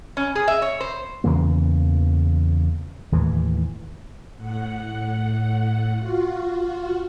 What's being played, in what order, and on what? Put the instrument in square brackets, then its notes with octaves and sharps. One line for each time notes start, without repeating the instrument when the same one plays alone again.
[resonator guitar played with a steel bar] C#4
G#4
E5
C#5
C5
[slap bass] E2 C#3 E3 A#3
D#2 A2 E3
[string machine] A2 F#5
F4 F#4